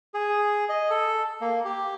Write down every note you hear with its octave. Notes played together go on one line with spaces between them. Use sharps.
G#4
D#5
A4
A#3
G4